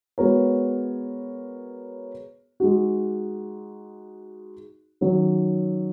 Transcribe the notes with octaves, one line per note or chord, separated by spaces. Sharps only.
G#3 B3 F#4 A#4 C#5
G#3 D#4 F#4
D#3 F#3 C#4